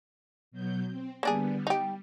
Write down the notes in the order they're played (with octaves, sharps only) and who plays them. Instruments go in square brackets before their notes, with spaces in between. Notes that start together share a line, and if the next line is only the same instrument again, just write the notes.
[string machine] B2 F#3 G6
C4
[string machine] D3 G3 B3 [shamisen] A#3 D4 G#4
[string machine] G3 [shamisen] D#4 G4